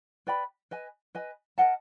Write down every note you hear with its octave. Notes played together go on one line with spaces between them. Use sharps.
B4 D5 G5 B5
B4 D#5 G#5
B4 D#5 G#5
A#4 D#5 F#5 A5